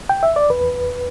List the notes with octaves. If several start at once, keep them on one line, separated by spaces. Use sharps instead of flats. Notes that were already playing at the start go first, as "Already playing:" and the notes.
G5
E5
D5
E2 B4